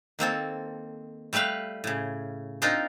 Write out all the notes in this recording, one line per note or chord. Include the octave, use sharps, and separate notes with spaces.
D#3 A#3 C4 A4
G3 A3 G4 B4 F5
A2 C#3
C4 D4 D#4 F4 A#4